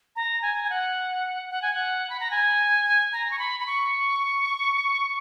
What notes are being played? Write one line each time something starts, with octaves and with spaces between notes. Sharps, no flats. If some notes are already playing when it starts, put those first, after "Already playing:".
A#5
G#5
G#5
F#5
F#5
G#5
F#5
B5
A#5
G#5
A#5
C#6
B5
B5
C#6